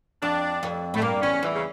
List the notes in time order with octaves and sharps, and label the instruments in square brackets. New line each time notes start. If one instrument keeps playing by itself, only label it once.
[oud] F2 [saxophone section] D4
[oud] F2
[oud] A2 [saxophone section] A3
[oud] G2 [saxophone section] A#3
[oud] E2 [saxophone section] C#4
[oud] E2 [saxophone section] E3
[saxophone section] C#3